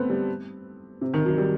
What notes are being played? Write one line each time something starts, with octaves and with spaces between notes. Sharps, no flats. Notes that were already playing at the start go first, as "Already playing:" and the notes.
Already playing: A3 B3 C4
G3
C3
D#3
F#3
G3